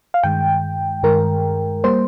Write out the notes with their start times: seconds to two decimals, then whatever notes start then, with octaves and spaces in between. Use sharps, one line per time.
0.14 F5
0.23 G2 D#3 G#3 G5
1.03 G2 D#3 G#3 A#4
1.84 G3 A#3 C5